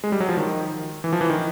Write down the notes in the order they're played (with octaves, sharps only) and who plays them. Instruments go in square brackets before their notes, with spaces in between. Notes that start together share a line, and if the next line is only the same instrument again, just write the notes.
[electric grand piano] G#3
G3
F#3
F3
D#3
E3
F3
E3
D#3